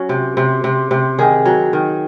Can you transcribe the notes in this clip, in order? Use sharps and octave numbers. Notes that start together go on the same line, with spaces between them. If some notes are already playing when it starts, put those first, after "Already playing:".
Already playing: F#3 C#4
C3
C3
C3
C3
D#3 G#4
F#3
D#3